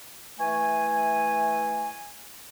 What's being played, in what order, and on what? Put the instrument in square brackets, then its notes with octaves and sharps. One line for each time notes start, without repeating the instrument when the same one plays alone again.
[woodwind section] E3 A3 G#5